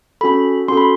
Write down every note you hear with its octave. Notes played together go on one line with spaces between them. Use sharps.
C#4 F#4 A4 B5
C#4 F#4 A4 C6
B5